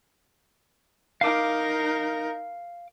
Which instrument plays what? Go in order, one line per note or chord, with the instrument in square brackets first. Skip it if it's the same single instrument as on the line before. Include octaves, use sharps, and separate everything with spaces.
[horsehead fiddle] D#4 A#4 [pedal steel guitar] F5 D6